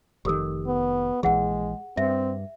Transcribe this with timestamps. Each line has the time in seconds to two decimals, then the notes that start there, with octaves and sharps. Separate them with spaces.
0.25 F1 D#3 G4 A4 A#4
0.67 B3
1.23 A#1 E3 G#3 G#4 F#5
1.97 G2 C4 E5